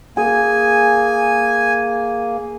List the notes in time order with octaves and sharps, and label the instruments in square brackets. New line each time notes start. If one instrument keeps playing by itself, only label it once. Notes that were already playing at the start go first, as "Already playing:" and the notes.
[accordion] A#3 [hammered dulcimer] G#4 [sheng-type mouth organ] G#5